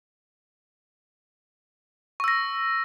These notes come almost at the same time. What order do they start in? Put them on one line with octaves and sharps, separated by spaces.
C#6 E6 A#6